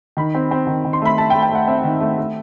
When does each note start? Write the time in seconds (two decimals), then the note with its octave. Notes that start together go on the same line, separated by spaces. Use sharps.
0.17 D#3 B5
0.35 C4
0.51 C4
0.67 D#3
0.85 D#3
0.93 C6
1.01 A3 B5
1.18 A3 A5
1.30 G5
1.35 A3
1.42 G5
1.51 A3 F#5
1.67 C4 E5
1.84 D#3
2.00 A3
2.17 A3